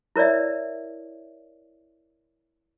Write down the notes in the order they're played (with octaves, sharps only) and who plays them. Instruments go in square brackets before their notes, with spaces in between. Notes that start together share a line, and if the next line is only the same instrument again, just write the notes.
[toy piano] E4 A#4 C#5 D5 E5